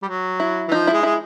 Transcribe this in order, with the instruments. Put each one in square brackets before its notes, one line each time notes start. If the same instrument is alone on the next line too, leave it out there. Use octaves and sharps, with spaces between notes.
[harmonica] G3
F#3
[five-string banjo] E4
[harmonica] E3
[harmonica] F3 [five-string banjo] D#4
[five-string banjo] E4
[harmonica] G#3
[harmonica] G#3 [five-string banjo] E4